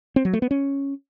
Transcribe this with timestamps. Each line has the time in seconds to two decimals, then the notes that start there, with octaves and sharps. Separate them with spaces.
0.16 C4
0.25 F#3
0.33 A3
0.42 B3
0.51 C#4